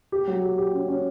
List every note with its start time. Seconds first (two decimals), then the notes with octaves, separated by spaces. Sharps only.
0.12 G4
0.27 F#3
0.43 G4
0.58 G4
0.73 C#4
0.88 C#4